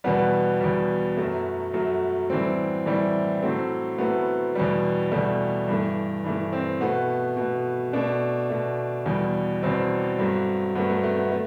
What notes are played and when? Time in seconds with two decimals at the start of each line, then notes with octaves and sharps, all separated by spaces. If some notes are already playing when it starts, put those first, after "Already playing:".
0.04 E2 B2 G3 B3
0.61 E2 B2 G3
1.17 F#2 F#3 A3
1.74 F#2 F#3 A3
2.30 A2 E3 G3 C4
2.86 A2 E3 G3
3.43 A2 F#3 A3 C4
3.98 A2 F#3 A3 B3
4.55 E2 B2 G3
5.12 E2 B2 G3 A3
5.68 G2 E3 A3
6.24 G2 E3 A3
6.53 C4
6.80 B2 A3 B3
7.37 B2 A3
7.93 B2 A3 D4
8.50 B2 A3
9.06 E2 B2 G3
9.63 E2 B2 G3 C4
10.19 G2 F#3 A3
10.75 G2 F#3 A3 B3
10.90 A3
11.03 A3
11.17 B3
11.32 A3